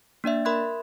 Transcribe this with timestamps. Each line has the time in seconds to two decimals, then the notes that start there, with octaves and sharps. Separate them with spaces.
0.24 A#3 D4 D5 E5
0.45 A#4 E5 B5 C6 F#6 G#6